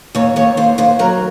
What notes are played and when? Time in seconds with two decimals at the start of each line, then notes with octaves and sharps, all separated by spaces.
0.15 D#2 C#5
0.36 D#2 C#5
0.57 D#2 C5
0.78 D#2 C5
0.99 F#3 A#4